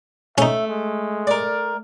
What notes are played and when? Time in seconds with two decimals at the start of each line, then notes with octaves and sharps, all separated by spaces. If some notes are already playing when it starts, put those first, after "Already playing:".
0.38 A3 C#4 D#4 E5
0.67 G#3
1.27 A#4 D5